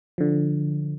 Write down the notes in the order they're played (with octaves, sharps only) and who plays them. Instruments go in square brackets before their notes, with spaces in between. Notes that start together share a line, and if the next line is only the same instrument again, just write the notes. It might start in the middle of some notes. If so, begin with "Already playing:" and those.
[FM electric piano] D3 F3